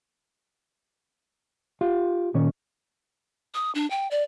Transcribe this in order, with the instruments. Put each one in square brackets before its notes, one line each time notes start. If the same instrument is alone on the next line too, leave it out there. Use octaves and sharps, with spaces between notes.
[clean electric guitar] F4 G4 F5
A#2 D#3 C#4 C#5
[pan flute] D#6
D4
G5
D5